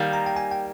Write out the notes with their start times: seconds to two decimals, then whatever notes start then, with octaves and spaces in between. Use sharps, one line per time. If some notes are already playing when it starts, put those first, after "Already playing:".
Already playing: D#3 G3 A#3
0.13 A#5
0.26 G5
0.36 G#5
0.51 G5